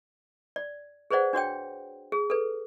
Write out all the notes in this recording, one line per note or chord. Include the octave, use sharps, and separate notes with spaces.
D5
G#4 B4 C5 D5 F#5
D4 F#4 C#5 G5
G#4
A4 B4